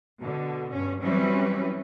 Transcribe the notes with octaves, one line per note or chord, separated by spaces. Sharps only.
B2 D3
G2 C#4
E3 F#3 G3 C4 C#4 B4